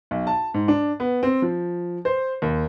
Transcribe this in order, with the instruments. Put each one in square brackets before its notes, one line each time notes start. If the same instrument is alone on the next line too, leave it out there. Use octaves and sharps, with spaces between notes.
[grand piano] B1
A5
G#2
D4
B3
C4
F3
C5
D#2